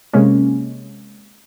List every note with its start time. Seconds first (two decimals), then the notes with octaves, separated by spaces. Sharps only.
0.14 C3 G#3 A#3 C#4